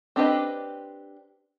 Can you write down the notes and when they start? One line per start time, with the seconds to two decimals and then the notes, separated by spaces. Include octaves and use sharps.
0.16 C4 D4 G4 B4 D#5